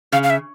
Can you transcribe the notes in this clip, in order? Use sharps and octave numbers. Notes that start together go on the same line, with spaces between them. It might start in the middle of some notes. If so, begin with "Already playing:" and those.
C#3 F5
F5
E5